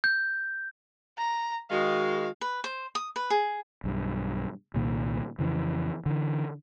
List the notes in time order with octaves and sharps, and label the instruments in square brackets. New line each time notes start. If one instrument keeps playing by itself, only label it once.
[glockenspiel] G6
[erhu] A#5
[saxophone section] D#3 G#3 [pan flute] F#4 [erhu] F5
[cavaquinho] B4
C5
D#6
B4
G#4
[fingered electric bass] B1 G2
C2 A#2 D#3
F2 C#3 E3
D3 E3